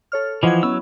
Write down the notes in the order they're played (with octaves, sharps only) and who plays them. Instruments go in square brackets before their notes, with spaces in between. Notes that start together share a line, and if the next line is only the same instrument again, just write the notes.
[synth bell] A4 C#5 F6
[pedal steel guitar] E3 F3 [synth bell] D#5 F#5 G#6
[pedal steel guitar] F#3 E6 [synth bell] B3 C#4 E4